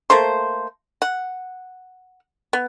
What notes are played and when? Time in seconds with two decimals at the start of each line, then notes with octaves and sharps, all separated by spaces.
0.10 A3 A#3 C5 C6
1.02 F#5
2.53 B3